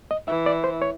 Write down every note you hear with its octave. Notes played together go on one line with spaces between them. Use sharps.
D#5
E3 E5
D5
C5
C#5